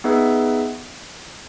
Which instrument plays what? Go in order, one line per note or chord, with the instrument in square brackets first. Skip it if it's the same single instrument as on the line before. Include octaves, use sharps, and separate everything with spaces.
[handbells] B3 D#4 G#4 B4 E5